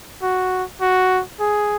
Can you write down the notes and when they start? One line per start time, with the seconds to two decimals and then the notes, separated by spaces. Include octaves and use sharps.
0.22 F#4
0.81 F#4
1.40 G#4